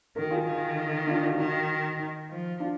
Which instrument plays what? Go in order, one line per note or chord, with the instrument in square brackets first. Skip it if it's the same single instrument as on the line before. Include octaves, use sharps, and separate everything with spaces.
[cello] D#3 [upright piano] F#4 A#4
[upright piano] F4 G#4
[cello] D#3
[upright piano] D4 F4
D#4 F#4
[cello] D#3 [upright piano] D#4 F#4
[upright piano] D#4
[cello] F3
[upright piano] D4 F4